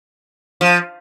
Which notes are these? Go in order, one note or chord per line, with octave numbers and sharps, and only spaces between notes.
F3